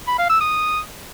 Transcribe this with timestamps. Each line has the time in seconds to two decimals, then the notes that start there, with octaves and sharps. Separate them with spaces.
0.08 B5
0.19 F5
0.30 E6
0.41 D#6